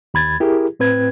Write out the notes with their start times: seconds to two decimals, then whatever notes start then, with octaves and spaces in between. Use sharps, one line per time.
0.14 D#2 B5 G#6 A6
0.40 E4 G4 G#4 A#4
0.80 A2 C4 B4 G#6